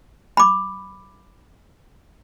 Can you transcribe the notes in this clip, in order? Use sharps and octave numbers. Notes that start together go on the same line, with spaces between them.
B5 D6